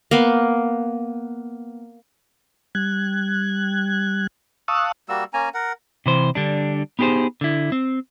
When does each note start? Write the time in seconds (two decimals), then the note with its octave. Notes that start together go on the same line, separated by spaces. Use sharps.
0.11 A#3 B3
2.75 G3 F#6 G#6
4.68 F5 A5 C#6 D#6 E6 F#6
5.09 G3 A#3 F#4 E6
5.34 A#3 C#4 G#5 A#5
5.54 A#4 F#5
6.06 C3 E3 C5
6.35 D3 G3 D4
6.99 B3 D#4 G4 G#4 C5
7.41 D3 E4
7.72 C4